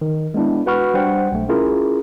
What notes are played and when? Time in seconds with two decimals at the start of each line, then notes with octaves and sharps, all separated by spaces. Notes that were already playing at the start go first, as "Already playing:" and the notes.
0.01 D#3
0.34 G#3 B3 D4 E4
0.66 F#4 B4 F#5 B5 C#6 F6
0.94 G3 D4 C5 F#5 G5
1.32 B1 A3
1.49 C#4 E4 F4 G#4 A#4